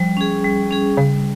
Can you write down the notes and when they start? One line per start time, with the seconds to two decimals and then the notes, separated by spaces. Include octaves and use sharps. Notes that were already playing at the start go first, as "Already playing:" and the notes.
Already playing: F3 G3
0.17 C#4 G#4
0.44 G3
0.71 C#4 G#4
0.97 C#3 G3